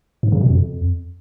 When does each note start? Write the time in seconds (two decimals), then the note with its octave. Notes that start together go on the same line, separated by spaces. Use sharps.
0.23 G#2
0.32 C#3
0.41 B2
0.50 F2